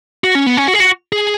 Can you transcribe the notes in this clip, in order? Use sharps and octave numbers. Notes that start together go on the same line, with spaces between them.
F#4
C#4
B3
C#4
F#4
G#4
F#4
G#4